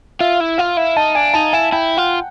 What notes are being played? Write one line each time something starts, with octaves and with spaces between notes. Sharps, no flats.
F4 E5
E4
F4 F5
E4
D#4 A5
D4 G#5
D#4 A5
E4 G#5
E4 G5
F4 F#5